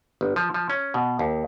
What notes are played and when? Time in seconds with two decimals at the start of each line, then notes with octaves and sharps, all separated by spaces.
0.21 G1
0.36 F3
0.54 F3
0.70 C#4
0.94 B2
1.19 D#2